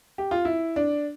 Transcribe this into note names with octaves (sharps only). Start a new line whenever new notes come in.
G4
F4
E4
D4